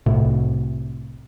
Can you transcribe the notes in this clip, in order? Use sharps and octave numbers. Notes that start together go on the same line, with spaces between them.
C2 A2 C3